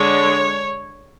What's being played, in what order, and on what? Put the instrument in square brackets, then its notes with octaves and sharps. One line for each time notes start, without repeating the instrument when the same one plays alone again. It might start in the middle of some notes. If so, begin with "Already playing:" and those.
Already playing: [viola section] D3 G#3 D4 C#5